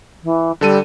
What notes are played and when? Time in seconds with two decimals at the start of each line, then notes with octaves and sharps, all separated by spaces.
0.23 E3
0.61 D3 G3 A4 D#7